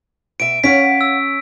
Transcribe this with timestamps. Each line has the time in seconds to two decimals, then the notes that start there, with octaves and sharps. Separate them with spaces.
0.40 B2 E5 D7
0.64 C#4 C#5 F5 F#5 B6 D7
1.01 E6